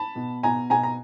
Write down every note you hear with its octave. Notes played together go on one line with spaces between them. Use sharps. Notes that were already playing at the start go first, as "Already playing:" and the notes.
Already playing: A5 B5
B2
B2 G#5 A#5
B2 G#5 A#5
A#5